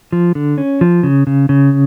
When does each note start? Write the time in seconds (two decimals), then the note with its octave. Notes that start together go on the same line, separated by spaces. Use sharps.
0.12 F3
0.35 D3
0.58 C#4
0.81 F3
1.03 C#3
1.27 C#3
1.49 C#3